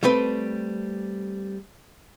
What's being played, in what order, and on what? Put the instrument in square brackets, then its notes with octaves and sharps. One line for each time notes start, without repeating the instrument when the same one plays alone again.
[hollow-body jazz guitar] G3 A3 C4 B4